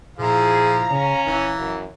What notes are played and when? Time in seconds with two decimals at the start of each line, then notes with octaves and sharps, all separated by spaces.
0.19 A#2 F3 E4 G#4 F5 A#5
0.91 C#3 C#4
1.26 D#1 E3
1.58 F#2